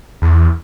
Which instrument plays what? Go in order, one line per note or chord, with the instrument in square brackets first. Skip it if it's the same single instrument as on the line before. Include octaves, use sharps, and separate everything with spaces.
[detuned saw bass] E2